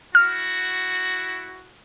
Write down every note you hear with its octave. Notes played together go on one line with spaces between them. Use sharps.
E4 F#4 F6